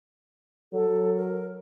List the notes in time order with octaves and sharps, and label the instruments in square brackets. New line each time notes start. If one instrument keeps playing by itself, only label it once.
[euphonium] F#3 [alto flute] A4
[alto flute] A#4